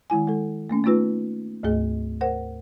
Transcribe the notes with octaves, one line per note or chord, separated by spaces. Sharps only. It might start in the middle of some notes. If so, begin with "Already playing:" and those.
D#3 G#3 E4 G#5
G#3 A4
A3 A#3 C#4
A3 B3 D#4 F4 B4
D2 G#2 A3 G#4 D#5
A#4 C5 F#5